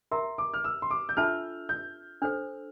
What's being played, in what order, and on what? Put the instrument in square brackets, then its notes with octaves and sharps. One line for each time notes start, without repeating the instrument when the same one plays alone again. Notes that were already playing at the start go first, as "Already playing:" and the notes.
[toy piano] A#4 E5 A#5 [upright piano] C6
[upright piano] D6
F6
E6
C6
D6
G6
[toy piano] D4 F4 A4 E5 A5 [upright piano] F6
[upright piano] G6
[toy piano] D4 A4 C5 [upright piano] F6